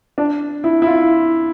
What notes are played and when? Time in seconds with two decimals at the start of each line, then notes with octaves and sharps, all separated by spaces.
0.18 D4
0.64 E4
0.82 E4
0.87 F4